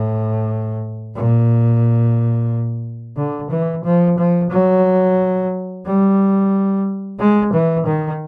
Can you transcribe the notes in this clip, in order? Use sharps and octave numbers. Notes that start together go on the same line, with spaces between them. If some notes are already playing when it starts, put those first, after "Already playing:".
Already playing: A2
A#2
D3
E3
F3
F3
F#3
G3
G#3
E3
D#3